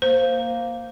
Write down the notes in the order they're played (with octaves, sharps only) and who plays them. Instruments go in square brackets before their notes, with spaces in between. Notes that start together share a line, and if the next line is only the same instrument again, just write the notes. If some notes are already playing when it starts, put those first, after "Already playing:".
[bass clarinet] A#3 [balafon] C5